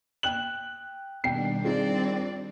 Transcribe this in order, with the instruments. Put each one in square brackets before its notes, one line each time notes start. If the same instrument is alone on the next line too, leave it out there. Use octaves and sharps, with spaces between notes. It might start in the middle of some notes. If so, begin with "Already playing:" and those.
[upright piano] G5 F#6 F#7
[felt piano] B2 [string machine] D#3 G3 D4 [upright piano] G5 C7
[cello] C4 D5 [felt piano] D#4 F4 G#4